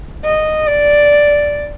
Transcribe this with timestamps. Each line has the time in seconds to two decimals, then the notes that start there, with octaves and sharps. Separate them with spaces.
0.25 D#5
0.67 D5